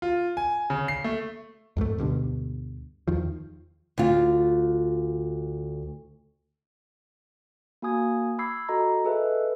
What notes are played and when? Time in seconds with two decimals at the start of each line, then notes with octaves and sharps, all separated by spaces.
0.02 F4
0.37 G#5
0.70 C#3
0.88 C7
1.04 A3
1.77 F2 G#2 G#3 A3
1.98 D2 G2 B2 D3
3.08 E2 D#3 F3
3.98 D2 F4
7.82 A#3 F#4 G#5 D#6 G#6
8.39 B5 D6 E6 G#6 C7
8.69 F#4 A4 D#5 A#5
9.05 G#4 A4 B4 D#5 E5